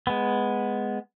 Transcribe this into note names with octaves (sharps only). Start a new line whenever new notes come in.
G#3 B3